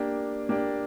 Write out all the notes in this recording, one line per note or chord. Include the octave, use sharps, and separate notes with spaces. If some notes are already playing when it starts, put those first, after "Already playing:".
Already playing: A#3 D4 G4 D5
A#3 D4 G4 D5